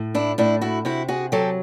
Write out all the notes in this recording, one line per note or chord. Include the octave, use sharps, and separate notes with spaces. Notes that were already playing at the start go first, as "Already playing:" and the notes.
Already playing: A2
D4 E4
A2 D4 E4
E4 F#4
C3 E4 F#4
F#4 G#4
F#3 G4 A4